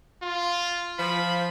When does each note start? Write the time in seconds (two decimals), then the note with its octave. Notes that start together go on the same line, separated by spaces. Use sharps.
0.22 F4
0.99 F3 B5